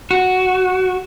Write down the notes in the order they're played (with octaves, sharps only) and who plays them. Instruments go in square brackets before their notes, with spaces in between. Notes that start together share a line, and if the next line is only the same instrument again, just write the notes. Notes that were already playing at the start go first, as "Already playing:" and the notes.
[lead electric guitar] F#4